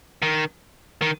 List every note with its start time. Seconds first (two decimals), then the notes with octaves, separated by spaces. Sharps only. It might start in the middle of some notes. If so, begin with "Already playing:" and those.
0.22 D#3
1.02 D#3